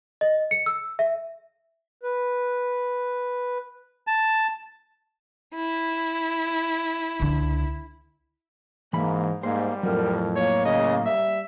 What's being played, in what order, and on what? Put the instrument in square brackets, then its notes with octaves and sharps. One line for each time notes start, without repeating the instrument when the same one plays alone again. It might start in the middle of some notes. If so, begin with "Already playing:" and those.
[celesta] D#5
C#7
E6
E5
[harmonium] B4
[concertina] A5
[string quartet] E4
[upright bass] C#2 D3
[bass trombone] G#2 [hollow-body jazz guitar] E3 B5 [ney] A#3
[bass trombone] G#2 [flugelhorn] G3 [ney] A#3 [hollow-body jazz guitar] C5
[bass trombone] F2 [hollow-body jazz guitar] A2 F#3 [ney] A#4
[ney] A#3 [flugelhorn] C#5
[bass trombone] C#3 [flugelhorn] D#5
[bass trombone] G3 [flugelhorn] E5